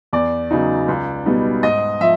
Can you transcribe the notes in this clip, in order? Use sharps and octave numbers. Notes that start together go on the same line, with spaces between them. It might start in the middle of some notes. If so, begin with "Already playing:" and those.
E2 D5
C#3 F#3 B3 D#4
C#2
B2 G3 B3 D#4
G#2 D#5
F3 E5